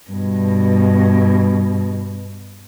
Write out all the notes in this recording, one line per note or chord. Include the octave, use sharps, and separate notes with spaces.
G2 B2